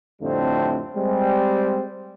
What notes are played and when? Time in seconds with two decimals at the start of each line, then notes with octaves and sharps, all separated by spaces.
0.21 F2 A2 D3 G3 A3 C4
0.96 G3 G#3 C4